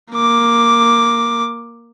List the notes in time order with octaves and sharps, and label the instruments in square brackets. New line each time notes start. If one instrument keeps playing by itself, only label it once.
[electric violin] A#3 D6